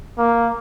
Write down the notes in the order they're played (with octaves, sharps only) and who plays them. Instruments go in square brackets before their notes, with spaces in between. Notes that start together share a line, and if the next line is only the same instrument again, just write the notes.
[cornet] A#3